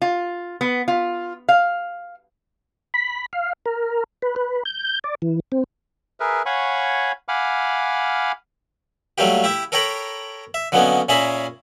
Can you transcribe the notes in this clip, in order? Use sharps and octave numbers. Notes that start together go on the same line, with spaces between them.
F4
B3
F4
F5
B5
F5
A#4
B4
B4
G6
D5
E3
C4
G#4 A#4 B4 E5
C#5 F5 F#5 G#5 B5 C#6
F5 F#5 G#5 B5 D6 F6
F#3 G3 A3 A#3 F4 G4
E4 G4 E5
A4 A#4 C#5 G5 A#5 B5
E5
D3 F#3 A#3 B3 C#4 D#4
A#2 C#4 G#4 E5 A#5 B5